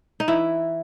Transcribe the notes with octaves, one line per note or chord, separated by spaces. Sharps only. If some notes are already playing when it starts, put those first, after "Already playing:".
D#4
E3 E4